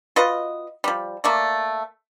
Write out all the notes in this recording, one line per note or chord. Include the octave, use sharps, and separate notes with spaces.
F4 F#4 B4 D#5
F3 G3
A3 A#3 D5